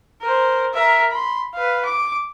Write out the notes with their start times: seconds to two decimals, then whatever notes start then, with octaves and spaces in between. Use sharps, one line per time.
0.21 A#4 C5
0.73 A#4 E5
1.11 B5 C6
1.54 B4 F5
1.85 D6